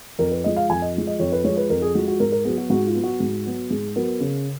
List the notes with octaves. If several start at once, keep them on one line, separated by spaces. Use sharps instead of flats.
F2 A#4
B4
F3 G#3 D#5
F5
F2 G#5
D#5
F3 G#3
D#5
F2 C#5
B4
F3 G#3 C#5
B4
F2 A#4
G#4
F3 G#3 F#4
F#4
G#2 A#4
A#4
F#3 B3 G#4
F#4
G#2 F#4
F4
F#3 B3
F#4
G#2
F#3 B3
G#2 G#4
F#3 B3 A#4
C#3